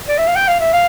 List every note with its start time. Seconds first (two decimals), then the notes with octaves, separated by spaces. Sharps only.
0.08 D5
0.18 E5
0.27 F5
0.36 G5
0.48 F5
0.60 E5
0.73 F5